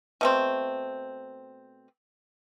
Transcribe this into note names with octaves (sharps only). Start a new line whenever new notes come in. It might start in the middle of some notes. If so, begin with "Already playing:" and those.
B2 A3 C4